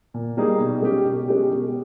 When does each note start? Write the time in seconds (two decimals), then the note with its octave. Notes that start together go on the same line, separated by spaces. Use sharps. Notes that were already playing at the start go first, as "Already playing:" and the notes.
0.14 A#2
0.37 G3 A#3 D#4 G#4
0.60 B2
0.82 G#3 C#4 G4
1.05 B2
1.29 G#3 C#4 G4
1.51 B2